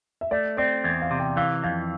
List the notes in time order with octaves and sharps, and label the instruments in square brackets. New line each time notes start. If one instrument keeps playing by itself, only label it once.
[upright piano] E5
[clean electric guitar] A3 [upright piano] D5
[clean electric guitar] C4 [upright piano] D5
[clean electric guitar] E2
[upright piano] F5
[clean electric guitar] C3
[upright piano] G5
[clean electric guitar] E3 [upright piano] F5
[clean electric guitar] F2 [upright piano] F5